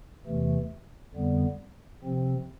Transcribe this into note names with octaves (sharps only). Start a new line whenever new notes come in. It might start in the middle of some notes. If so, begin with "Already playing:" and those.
E2 C3 E3 A3
F2 D3 G3 B3
C3 F3 C4